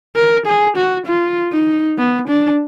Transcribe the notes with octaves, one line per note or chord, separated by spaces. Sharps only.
A#4
G#4
F#4
F4
D#4
B3
D4